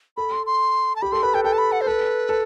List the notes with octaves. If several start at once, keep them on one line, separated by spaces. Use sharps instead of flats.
A4 B5
C6
C6
A5
G4 B5
A4 C6
B4 B5
A4 G5
A4 G5
A5
B5
F#5
C5
A4 B4
A4